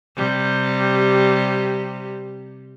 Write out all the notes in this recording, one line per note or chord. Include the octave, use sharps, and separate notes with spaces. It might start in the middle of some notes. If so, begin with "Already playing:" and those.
C3 G3